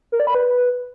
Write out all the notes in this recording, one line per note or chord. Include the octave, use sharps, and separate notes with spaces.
A#4
D5
B5
B4